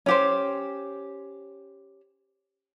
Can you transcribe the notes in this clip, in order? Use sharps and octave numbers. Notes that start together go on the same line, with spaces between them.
C#4 G4 C5